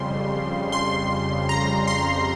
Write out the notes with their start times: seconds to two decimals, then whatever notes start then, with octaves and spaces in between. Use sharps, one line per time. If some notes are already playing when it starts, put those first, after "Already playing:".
Already playing: F2 C#3 G3 C6
0.72 C6
1.49 A#5
1.87 C6